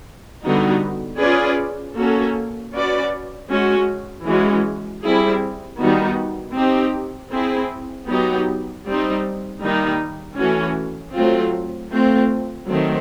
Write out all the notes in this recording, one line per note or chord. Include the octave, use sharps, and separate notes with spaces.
D3 G3 B3 D#4 F#4
C#4 F4 G#4 B4 D5
A#3 C#4 F#4 A4
C#4 F#4 B4 D5
G#3 C#4 F#4
E3 G#3 C#4 F#4
G3 C4 E4 G#4
D#3 G3 B3 D#4 F#4
C4 D#4 G4
C4 E4 G#4
F#3 B3 D#4 G4
G3 C4 D#4
D#3 G3 A#3 D#4
E3 A3 C#4 F#4
F#3 A3 C4 F4
A3 C4 F4
D#3 F#3 A3 C4